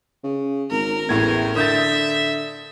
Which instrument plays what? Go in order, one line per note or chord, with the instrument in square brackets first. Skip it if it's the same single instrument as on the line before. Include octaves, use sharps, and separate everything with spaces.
[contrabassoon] C#3
[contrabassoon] G#1 [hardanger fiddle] A#4
[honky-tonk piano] A1 A2 G#6 [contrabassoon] E2
[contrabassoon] D3 [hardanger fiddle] E5 [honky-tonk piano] D#6 G6 A6